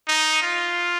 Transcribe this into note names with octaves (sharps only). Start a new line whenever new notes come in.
D#4
F4